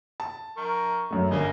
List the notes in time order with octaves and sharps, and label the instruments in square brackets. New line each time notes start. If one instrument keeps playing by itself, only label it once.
[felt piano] A5
[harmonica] A#4 C#6
[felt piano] F#2 A3
[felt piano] G1 [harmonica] A#3 D#5 G#5